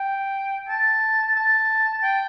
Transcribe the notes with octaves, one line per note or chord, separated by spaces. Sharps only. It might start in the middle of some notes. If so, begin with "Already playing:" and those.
Already playing: G5
A5
A5
G5